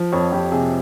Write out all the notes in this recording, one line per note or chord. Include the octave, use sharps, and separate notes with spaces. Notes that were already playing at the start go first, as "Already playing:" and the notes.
Already playing: F3
F2 C#5
F2 G4
C3 G#4